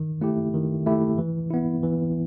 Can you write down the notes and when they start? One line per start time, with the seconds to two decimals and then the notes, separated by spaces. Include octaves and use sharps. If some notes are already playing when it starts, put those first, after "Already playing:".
Already playing: D#3
0.21 A3 E4 G4
0.54 D#3
0.86 A3 E4 G4
1.18 E3
1.51 B3 E4
1.83 E3